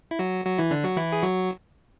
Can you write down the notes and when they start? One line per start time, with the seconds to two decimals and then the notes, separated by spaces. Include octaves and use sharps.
0.11 E4
0.19 F#3 F#4
0.45 F#3 F#4
0.58 E3 E4
0.71 D3 D4
0.84 F#3 F#4
0.97 E3 E4
1.12 G#4
1.22 F#3 F#4